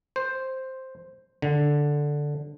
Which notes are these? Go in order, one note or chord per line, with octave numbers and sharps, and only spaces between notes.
C5
D3